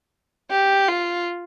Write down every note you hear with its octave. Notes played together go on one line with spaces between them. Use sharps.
G4
F4